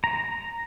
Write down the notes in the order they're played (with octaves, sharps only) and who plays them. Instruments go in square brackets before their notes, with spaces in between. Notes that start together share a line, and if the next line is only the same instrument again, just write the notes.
[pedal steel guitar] A#5